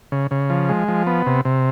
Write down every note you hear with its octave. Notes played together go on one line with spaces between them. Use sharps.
C#3
C#3
F3
G#3
F3
B3
C3
C3